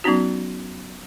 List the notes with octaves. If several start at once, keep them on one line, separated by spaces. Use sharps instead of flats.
F#3 B3 C#4 D#4 F#4